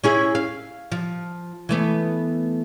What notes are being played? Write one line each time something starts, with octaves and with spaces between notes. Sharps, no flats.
C#4 E4 G#4
F5
F3
E3 A3 B3